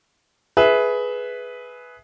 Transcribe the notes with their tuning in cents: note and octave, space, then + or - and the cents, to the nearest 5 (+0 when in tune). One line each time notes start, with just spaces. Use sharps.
G#4 +15 B4 +0 E5 -5